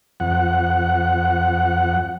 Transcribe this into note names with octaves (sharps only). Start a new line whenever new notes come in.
F2 F#5